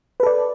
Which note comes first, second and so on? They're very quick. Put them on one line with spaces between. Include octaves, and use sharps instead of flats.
B4 A4 D5